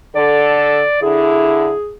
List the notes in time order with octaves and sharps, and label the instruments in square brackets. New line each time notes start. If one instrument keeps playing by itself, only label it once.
[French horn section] D3 A4 [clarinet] D5
[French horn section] D3 E4 [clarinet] G#4